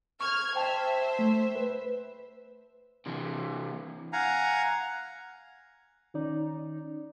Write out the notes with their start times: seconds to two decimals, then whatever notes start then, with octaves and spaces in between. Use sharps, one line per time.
0.21 C#6 F6 G#6
0.56 C5 E5 G5 A5
1.19 A3
1.55 B4
3.06 C3 E3
4.13 F5 F#5 G#5 A#5
6.14 D#3 C#4 D#4 D5